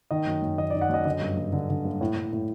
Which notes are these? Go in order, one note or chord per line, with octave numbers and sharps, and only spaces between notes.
D#3 D#5
F#2
F#2
D#3 D#5
D5
D#3
F#5
F#2 D#5
D3 D#5
G2
G2
D3
D3
G2
A2
A2
A2